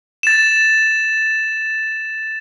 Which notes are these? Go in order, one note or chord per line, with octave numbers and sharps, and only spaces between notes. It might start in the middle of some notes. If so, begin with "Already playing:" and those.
A6 E7